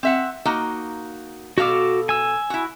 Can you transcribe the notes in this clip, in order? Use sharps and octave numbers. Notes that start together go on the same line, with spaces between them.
C4 E5 F#5
A#3 D#4 F#4
B2 F#4 A4 F5 D6
G#5 E6
E4 F#4